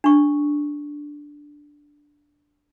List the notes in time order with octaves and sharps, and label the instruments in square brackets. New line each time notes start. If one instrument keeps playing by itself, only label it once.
[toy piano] D4 C#6